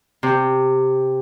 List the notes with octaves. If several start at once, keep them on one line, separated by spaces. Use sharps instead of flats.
C3